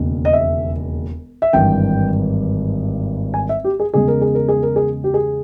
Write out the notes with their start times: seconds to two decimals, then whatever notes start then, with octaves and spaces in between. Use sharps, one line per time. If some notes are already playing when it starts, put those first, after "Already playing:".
Already playing: E1 D#2 C#3
0.25 D#5
0.33 E5
1.42 E5
1.53 G#1 G2 E3 G5
3.34 G#5
3.49 E5
3.64 G4
3.80 G#4
3.94 E2 C#3 G#3 G#4
4.08 A#4
4.21 G#4
4.35 A#4
4.48 G#4
4.63 A#4
4.76 G#4
5.04 G4
5.14 G#4